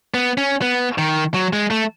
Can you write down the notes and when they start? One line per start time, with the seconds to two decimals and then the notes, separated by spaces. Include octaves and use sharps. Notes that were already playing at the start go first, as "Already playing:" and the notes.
0.14 B3
0.38 C#4
0.62 B3
0.98 D#3
1.34 F#3
1.53 G#3
1.71 A3